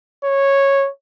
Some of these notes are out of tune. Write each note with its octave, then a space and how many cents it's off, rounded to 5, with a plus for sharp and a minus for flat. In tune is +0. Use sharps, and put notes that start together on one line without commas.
C#5 -10